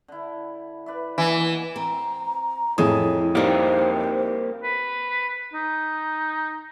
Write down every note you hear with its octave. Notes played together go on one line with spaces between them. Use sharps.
D3 E4
B4 D5 E5
B2 E3 A#3
C4 A#5
F2 A2 E4 G#4 D#6
G3 A#3 C4 D#4 G4 C5
B4
D#4